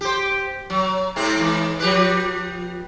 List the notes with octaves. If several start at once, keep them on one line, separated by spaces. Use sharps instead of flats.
G4 C5
F#3
G#2 C3 C4
G#2 E3
F3 G4 B4